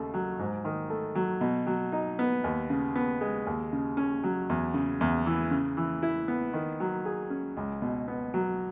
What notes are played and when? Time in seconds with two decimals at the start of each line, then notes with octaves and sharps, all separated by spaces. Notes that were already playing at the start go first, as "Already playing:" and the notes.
Already playing: D#2 C#3 A3
0.14 F#3
0.39 G#2
0.65 D#3
0.90 A3
1.15 F#3
1.41 B2
1.67 F#3
1.92 D#4
2.19 B3
2.44 D#2
2.70 C#3
2.96 B3
3.21 G#3
3.47 D#2
3.73 C#3
3.97 C#4
4.24 F#3
4.49 E2
4.74 C#3
5.01 E2
5.26 E3
5.51 C#3
5.77 E3
6.03 E4
6.28 B3
6.53 D#3
6.80 F#3
7.05 G#4
7.30 C#4
7.57 C#2
7.82 B2
8.08 B3
8.34 F#3